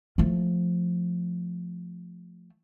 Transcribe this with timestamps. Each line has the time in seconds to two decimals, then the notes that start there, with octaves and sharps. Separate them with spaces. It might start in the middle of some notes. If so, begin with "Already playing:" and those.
0.18 F3 A3